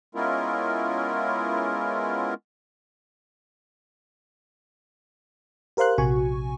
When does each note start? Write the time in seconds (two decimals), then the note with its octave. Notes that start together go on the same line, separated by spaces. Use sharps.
0.15 G#3 B3 C#4 E4 F4 A#4
5.77 G4 A#4 C5 F5 C6 F#6
5.98 A#1 C3 F#4 G#5 C#6